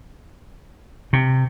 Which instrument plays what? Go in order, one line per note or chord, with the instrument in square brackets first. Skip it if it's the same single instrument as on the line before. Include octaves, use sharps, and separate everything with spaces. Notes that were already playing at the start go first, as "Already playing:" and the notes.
[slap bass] C3